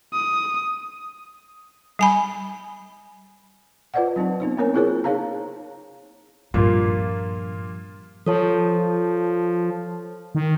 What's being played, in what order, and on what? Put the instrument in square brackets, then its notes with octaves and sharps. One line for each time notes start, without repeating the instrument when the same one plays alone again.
[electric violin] D#6
[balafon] G3 G#5 B5
F4 B4 C5 D5 D#5 F#5
F#3 C4 D#4 A5
B3 C4 D#4 C5
A#3 C4 C#4 A#4 C#5 G#5
E4 F4 G#4 A#4 C5 C#5
D#4 G#4 C#5 F5 A5 A#5
[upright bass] G2 F3 [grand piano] A#2 A#3 F4
[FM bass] F3 [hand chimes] A4 C#5 A5
[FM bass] D#3